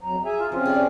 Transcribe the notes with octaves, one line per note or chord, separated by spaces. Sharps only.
F2 F#3 A#5
G#4 E5 G#5
F4
C3 F3 C4 C#4 F4
G#4 D5